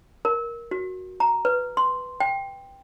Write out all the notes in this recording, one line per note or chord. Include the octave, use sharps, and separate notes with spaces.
A#4
F#4
A#5
B4
C6
G5